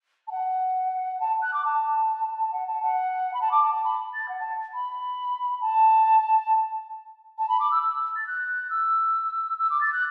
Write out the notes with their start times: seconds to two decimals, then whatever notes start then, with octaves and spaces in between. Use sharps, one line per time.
0.27 A5
0.31 F#5
1.20 A5
1.42 F#6
1.53 D6
1.65 A5
2.52 F#5
2.67 A5
2.82 F#5
3.34 B5
3.41 A5
3.51 D6
3.62 A5
3.74 A5
3.84 B5
4.14 A6
4.28 F#5
4.40 A5
4.74 B5
5.61 A5
7.38 A5
7.49 B5
7.60 D6
7.71 E6
7.82 E6
8.16 A6
8.27 F#6
8.70 E6
9.58 E6
9.70 D6
9.81 A6
9.93 F#6